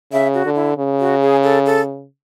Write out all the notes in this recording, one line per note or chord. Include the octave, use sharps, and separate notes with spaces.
C#3 E5
F#4
D3
E4
C#3
F#4
G#4
A4
A4